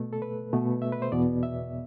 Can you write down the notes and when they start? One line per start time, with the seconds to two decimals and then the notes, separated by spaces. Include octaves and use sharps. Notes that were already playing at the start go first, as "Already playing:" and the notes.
Already playing: B2 A3
0.13 A4
0.22 B4
0.53 B2 A3
0.82 E5
0.92 B4
1.02 C5
1.12 E2 B2 B3 D5
1.43 E5